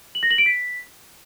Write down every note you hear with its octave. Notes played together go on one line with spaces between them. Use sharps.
F#7
A#6
F#7
D7
B6